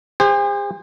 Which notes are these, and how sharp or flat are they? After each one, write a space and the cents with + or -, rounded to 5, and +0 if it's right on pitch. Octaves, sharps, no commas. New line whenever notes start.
G#4 -45 C5 +0